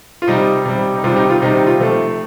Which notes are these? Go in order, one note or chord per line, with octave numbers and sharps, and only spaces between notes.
F4
C3 G3 D#4
C3 G3
D#4
C3 D#3 G3 F4
D#4 G4
F4
C3 D#3 G3 D#4 G4
D#4
F4
C3 F3 A3